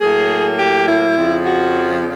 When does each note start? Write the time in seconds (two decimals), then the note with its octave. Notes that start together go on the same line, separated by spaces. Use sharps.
0.01 A2 F#3 A#3 G#4
0.59 G4
0.88 E4
1.17 F2 C#3 F3
1.46 F#4